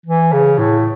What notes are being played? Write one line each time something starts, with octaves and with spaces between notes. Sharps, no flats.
E3
C#3
A2